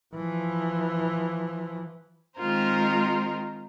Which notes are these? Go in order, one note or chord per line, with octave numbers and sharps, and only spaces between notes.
E3 F3
D#3 G#3 C4 F4 A#4 C5